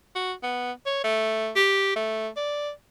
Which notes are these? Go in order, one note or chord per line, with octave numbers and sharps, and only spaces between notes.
F#4
B3
C#5
A3
G4
A3
D5